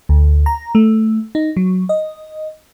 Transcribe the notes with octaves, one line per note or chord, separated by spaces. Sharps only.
D2
A#5
A3
D#4
F#3
D#5